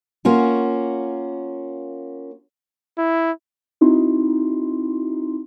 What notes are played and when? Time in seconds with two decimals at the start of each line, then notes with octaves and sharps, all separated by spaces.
0.25 A#3 C#4 F4 F#4
2.98 E4
3.81 C4 D#4 E4 F#4 C6